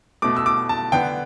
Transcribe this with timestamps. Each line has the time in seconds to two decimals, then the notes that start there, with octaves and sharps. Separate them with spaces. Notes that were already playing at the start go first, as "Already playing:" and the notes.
0.22 B2 A3 D6
0.37 E6
0.46 D6
0.69 A5
0.92 D3 B3 G5